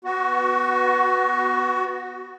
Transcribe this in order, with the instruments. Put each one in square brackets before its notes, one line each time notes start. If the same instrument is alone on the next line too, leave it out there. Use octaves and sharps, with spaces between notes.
[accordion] B3 F#4